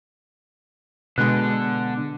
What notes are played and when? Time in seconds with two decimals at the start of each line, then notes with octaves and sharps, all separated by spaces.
1.18 B2 D3 G#3 F#6